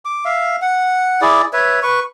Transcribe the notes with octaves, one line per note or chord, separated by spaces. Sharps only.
D6
E5 F5
F#5
E4 G#4 D5
B4 C#5 E5
B4 C#6